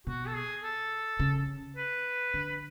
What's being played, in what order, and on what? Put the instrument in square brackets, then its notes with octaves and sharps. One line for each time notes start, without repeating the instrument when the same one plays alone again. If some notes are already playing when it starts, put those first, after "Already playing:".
[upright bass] B2 [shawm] F#4
[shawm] A4
G#4
A4
[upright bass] C#3
[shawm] B4
[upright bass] D3